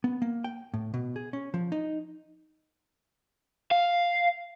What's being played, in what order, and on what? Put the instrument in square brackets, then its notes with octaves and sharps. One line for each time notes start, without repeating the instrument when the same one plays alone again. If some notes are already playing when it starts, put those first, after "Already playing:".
[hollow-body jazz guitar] B3
A#3
G5
A2
B2
G#4
C#4
F3
D#4
[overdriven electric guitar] F5